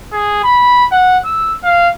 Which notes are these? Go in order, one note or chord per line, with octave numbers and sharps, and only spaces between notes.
G#4
B5
F#5
E6
F5